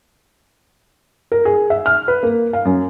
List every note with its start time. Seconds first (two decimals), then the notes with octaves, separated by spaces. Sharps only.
1.32 A#4
1.45 G#4
1.70 E5
1.86 F6
2.08 B4
2.23 A#3
2.53 F5
2.65 F#2